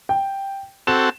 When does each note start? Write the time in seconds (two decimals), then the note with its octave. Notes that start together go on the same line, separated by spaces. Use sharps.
0.09 G5
0.87 C4 F#4 A4 E7